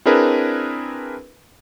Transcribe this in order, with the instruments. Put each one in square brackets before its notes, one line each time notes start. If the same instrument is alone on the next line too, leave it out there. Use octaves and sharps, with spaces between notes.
[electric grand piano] C4 D4 E4 G#4 A#4 B4